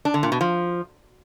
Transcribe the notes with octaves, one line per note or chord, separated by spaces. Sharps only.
D4
D3
A#2
B2
F3